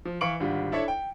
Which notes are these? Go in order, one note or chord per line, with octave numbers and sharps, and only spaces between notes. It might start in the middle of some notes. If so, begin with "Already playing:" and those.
F3
E3 F5 C#6 C#7 D7 F#7
G#1 D3 G3 F4
D4 E4 A4 C#5 E5
G5